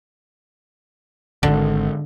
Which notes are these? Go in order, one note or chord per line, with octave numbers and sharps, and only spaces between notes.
D1 G#1 D3